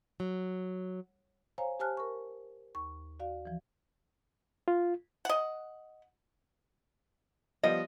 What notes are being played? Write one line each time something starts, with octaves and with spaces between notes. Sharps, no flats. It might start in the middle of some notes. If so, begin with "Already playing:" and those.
F#3
C5 C#5 F5 G#5 A#5
G4 C5 G#5 A5 F6 F#6
A#4 C#6
D#2 C#6
F#4 D5 F5
E3 F3
F4
D#5 F#5
F3 G3 B3 D#5